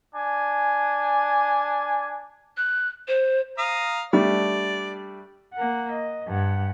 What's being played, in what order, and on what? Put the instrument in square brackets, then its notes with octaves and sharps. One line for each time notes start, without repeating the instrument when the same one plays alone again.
[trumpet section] D4 G#5
[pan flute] F#6
C5
[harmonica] F5 A#5 D#6
[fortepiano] G3 A3 D4 [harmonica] D5
[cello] A#3 F#5
D#5
G2 F#5